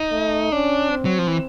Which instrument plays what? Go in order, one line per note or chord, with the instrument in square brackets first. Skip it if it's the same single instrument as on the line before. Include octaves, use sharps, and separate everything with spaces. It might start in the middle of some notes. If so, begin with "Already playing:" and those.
Already playing: [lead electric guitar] D#4
[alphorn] A3
[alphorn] C#4 [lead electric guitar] D4
[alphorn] C4
[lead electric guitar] F#3
F3
E3